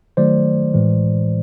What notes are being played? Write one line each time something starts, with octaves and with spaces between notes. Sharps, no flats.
D#3 F#3 A3 C5 D5
A2 E3 G#3